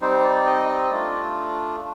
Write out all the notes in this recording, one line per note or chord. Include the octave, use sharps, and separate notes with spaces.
G3 C4 D#4 C5
D5
D#5
D#5
A3 D4 F4 D5